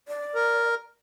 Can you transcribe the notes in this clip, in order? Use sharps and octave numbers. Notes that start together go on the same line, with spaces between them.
D5
A#4